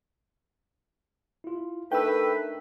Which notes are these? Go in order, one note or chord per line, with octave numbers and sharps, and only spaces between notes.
E4 F4
A3 D4 D#4 A#4 B4 G5 E6